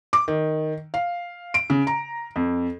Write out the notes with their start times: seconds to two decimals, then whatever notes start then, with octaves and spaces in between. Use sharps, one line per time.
0.13 D6
0.28 D#3
0.94 F5
1.54 D7
1.70 C#3
1.87 A#5
2.36 F2